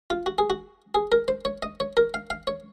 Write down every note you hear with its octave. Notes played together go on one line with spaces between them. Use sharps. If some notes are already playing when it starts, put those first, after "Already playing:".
F4
F#4
G#4
F#4
G#4
A#4
C5
C#5
D#5
C#5
A#4
F5
F5
C#5